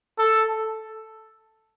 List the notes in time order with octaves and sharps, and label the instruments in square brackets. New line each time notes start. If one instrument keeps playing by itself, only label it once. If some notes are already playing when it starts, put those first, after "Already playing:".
[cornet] A4